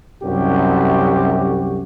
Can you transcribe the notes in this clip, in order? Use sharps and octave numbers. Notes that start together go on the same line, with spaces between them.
C2 F#2 F#4 G4